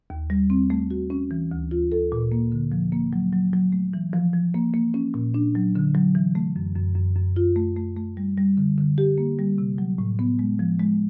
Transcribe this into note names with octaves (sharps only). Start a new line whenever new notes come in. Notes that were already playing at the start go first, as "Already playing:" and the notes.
D#2
G3
C4
A3
F#4
C#4
E3
D2
F4
A4
A#2
A#3
D3
F3
A#3
F#3
F#3
F#3
A3
E3
F3
F3
A#3
A#3
C#4
A#2
D4
F#3
D3
F#3
E3
A3
F#2
F#2
F#2
F#2
F4
A3
A3
A3
G3
G3
D3
D3
G4
A#3
G3
C3
F#3
A2
B3
G#3
F3
G#3